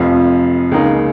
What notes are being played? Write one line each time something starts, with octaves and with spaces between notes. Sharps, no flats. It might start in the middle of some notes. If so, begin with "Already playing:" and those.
Already playing: F1 F2 F3
C#2 C#3 A#3 D#4